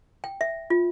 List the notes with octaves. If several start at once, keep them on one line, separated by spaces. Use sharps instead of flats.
G5
E5
F4